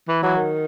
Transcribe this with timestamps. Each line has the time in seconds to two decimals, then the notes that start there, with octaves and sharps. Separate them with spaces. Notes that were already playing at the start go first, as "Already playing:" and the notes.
0.08 E3
0.23 E3 F#3
0.37 D#3